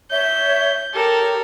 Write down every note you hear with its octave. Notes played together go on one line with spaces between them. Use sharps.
C#5 E5 G6
G4 A4 A#4 C#5